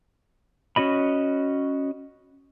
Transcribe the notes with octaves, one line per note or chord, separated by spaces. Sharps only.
C#4 F#4 D#5 B5